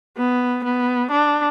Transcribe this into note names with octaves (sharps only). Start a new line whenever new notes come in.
B3
B3
D4